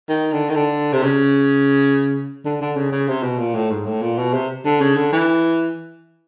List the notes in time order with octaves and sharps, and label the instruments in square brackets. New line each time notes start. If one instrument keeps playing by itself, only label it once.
[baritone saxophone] D#3
D3
D#3
D3
C3
C#3
D3
D3
C#3
C#3
C3
B2
A#2
A2
G#2
A2
A#2
B2
C3
D3
C#3
D3
E3